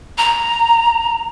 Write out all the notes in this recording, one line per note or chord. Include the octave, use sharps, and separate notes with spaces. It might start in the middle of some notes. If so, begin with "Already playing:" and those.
A#5